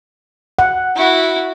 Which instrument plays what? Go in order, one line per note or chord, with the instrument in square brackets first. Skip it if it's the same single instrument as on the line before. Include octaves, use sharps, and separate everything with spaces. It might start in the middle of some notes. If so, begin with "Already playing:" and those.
[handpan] F#5
[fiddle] E4 F#4